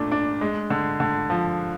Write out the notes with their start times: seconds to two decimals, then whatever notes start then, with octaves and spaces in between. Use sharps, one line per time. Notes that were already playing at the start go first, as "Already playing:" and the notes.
Already playing: A#2 A3 D4
0.12 D4
0.41 G#3
0.70 D3
1.00 D3
1.30 F3